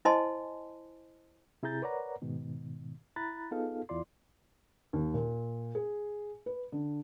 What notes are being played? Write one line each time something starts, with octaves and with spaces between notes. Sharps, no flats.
E4 C5 D#5 G#5 A5 C6
C3 E4 G#4 A#5 G6 A6
A#4 B4 C#5 D5 F#5 A#5
G#2 B2 D#3
E4 A#5 B5 F#6 A6
B3 D#4 F4 G#4 A4 F5
E2 E4 F4 D5 C6
D#2
A#2
G#4
B4
D3